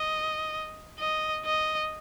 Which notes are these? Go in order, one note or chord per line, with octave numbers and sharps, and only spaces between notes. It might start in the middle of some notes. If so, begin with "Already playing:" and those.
Already playing: D#5
D#5
D#5